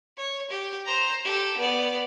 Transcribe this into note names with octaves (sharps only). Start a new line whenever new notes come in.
C#5
G4
C5 A#5
G4 A4
B3 D5